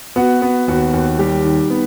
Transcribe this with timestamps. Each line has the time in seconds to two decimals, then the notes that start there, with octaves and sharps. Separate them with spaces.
0.16 B3 F#4
0.42 B3
0.68 D#2 F#4
0.93 D#2
1.19 G3 G4
1.44 D#3
1.70 B3